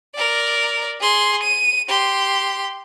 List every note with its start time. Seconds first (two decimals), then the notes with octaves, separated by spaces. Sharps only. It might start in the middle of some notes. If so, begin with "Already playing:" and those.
0.15 A#4 D5
1.01 G#4 C6
1.42 D#7
1.89 G4 C6